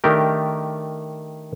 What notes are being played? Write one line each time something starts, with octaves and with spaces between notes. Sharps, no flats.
D#3 A3 D4 G4 A#4